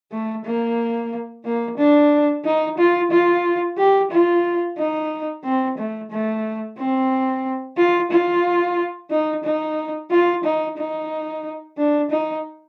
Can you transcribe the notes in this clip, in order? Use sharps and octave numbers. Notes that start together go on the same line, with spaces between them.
A3
A#3
A#3
D4
D#4
F4
F4
G4
F4
D#4
C4
A3
A3
C4
F4
F4
D#4
D#4
F4
D#4
D#4
D4
D#4